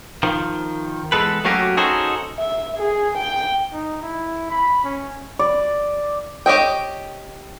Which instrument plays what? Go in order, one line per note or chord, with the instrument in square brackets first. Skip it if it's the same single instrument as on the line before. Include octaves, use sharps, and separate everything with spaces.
[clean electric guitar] D#3 F3
E2 C3 G#3 A4 B4
F#3 A3 A#3 C#4 F#4 G4
C#4 D#4 F#4 G#4 A4 C5
[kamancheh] E5
G#4
G5
[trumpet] D#4
E4
B5
C#4
[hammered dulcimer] D5
[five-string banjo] G4 C#5 D#5 G5